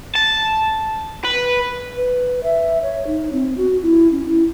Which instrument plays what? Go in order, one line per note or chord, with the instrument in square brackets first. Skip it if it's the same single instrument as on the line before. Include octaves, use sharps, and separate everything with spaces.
[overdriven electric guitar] A5
B4
[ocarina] B4
E5
C#5
D#4
C4
F#4
E4
C#4
E4